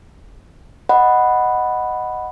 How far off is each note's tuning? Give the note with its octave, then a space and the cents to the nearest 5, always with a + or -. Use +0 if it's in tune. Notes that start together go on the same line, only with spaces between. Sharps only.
D#5 +0 F#5 +0 B5 +0